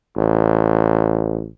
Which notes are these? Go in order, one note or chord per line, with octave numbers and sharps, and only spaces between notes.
A1